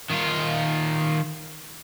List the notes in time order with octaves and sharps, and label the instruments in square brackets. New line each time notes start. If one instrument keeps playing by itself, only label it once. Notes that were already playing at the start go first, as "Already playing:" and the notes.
[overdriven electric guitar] D#3 F4